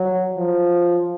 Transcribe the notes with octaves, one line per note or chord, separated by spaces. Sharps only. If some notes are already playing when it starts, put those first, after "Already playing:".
Already playing: F#3
F3